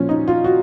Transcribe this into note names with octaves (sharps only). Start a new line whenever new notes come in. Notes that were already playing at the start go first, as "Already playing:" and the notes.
Already playing: A#2 F3 C#4
D#4
F4
F#4